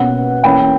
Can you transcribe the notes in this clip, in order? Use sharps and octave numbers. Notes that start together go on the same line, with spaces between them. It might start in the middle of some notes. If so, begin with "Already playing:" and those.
Already playing: B2 A#3 C#4 F#5
E3 A#3 C#4 G5 B5